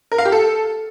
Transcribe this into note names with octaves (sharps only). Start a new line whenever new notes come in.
A#4
F5
G4
A4